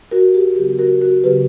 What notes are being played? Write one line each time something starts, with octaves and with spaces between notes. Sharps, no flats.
F#4 A#4
G4
C#3 F#3 B3 G4
F#4 A#4
F#4 A#4
C#3 F#3 B3 G4 B4